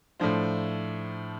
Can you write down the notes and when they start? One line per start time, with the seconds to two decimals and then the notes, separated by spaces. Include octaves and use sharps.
0.20 A2 F3 D4 C5